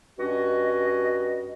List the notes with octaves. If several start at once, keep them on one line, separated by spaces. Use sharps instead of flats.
G2 C#4 F#4 D#5